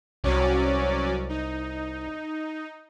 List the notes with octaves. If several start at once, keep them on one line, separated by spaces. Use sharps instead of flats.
C2 F#3 C#4 D5
D#4